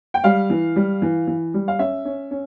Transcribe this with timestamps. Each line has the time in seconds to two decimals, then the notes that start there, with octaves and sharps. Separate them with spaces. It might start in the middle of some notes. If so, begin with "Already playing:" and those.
0.14 G5
0.24 G3 F5
0.50 E3
0.76 G3
1.02 E3
1.27 E3
1.54 G3
1.68 F5
1.79 C#4 E5
2.05 C#4
2.31 C#4